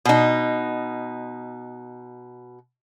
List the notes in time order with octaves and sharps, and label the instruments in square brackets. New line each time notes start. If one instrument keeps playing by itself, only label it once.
[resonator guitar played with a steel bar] B2 D#4